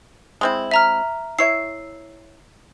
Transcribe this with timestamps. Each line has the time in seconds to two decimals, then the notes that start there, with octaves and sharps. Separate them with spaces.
0.41 G#3 C4 E4
0.71 E5 A#5 F6
1.39 E4 C#5 E5 C7